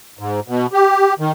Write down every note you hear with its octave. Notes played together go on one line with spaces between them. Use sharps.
G#2
B2
G4
D#3